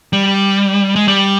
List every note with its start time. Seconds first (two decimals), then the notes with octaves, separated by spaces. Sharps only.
0.13 G3
0.96 G#3
1.08 G3